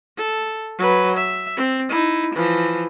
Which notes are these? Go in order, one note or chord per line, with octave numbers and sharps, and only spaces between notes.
A4
F#3 B4
E5
C4
D#4 E4
E3 F3